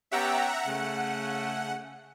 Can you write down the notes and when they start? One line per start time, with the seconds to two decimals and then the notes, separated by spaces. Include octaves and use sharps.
0.11 B3 C#4 G4 E5 F#5 A#5
0.65 C#3 A3 F#5